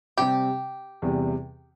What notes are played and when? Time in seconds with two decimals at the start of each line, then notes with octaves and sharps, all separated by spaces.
0.18 C3 G3 C4 G4
1.02 E2 C3 G3